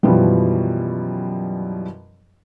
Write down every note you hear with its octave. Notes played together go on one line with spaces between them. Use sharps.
F#2 B2 E3 F3 G3